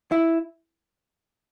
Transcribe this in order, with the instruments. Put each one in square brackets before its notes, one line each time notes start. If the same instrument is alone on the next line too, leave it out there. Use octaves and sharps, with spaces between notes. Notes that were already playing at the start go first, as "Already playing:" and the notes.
[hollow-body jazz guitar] E4